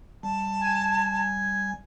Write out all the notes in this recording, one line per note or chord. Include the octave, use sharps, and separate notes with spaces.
G3 A5
G#5